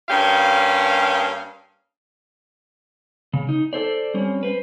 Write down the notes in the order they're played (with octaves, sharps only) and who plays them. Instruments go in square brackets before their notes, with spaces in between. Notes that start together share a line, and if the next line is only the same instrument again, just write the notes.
[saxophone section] G2 A#3 C#4 G4 F5
[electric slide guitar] C#3
D#4
A4 C5 D5
G3 C4 C#4
B4 C5